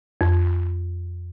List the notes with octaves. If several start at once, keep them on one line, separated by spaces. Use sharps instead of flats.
F2